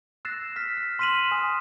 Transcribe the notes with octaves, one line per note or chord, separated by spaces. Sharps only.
E6 F#6 A6 A#6 C7 E7
F6 B6
F6
C6 F6 B6 D#7 E7 F#7
G#5 D#6